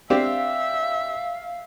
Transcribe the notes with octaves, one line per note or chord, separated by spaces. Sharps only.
C4 D4 G4 E5 F5